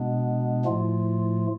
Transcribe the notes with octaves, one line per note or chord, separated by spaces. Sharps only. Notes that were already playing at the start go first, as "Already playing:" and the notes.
Already playing: B2 G#3 B3 D4
A2 F3 A3 F4